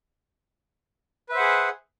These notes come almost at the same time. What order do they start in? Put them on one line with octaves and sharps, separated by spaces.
B4 E5 C5 F#5 G#4